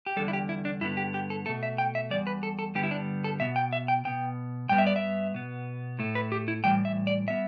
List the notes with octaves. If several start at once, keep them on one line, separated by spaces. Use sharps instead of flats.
G4
E2 D3 G3 A4
E4
G4
E4
D4
G2 D3 B3 E4
G4
G4
A4
B2 A3 A4
E5
G5
E5
E2 E3 G3 D5
B4
A4
A4
G2 D3 G3 B3 G4
E4
D4
A4
B2 B3 E5
G5
E5
G5
B2 B3 G5
G2 G3 B3 G5
E5
D5
E5
B2 B3
A2 A3
B4
G4
E4
A2 E3 G3 G5
E5
D5
G3 B3 E5